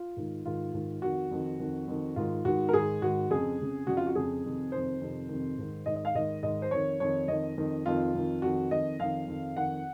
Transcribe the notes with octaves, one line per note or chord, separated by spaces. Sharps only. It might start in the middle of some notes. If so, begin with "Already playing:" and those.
Already playing: F4
G#2 D#3
G#2 D#3 F4
G#2 D#3
F2 D#3 F#4
F2 D#3
F2 D#3
F2 D#3
G#2 D#3 F4
G#2 D#3 F#4
A#4
G#2 D#3 G#4
G#2 D#3 F#4
F2 C#3 G#4
F2 C#3
F2 C#3 F#4
F4
F#4
F2 C#3 G#4
F2 C3 D#3
F2 C3 D#3 C5
F2 C3 D#3
F2 C3 D#3
G#2 D#3
G#2 D#3 D#5
D#5
F5
G#2 D#3 D#5
G#2 D#3 D#5
C5
F2 D#3 C#5
F2 D#3 C#5
F2 D#3 D#5
F2 D#3
F2 D#3 F4
F2 D#3
F2 D#3 F#4
F2 D#3 D#5
F2 D#3 F5
F2 D#3
F2 D#3 F#5